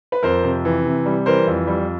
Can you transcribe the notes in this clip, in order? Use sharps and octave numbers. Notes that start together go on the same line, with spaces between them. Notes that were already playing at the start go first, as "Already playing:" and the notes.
B4
F2 A#4 C5
C3
E3
C3
G3
E3 A#4 C5
F2
G3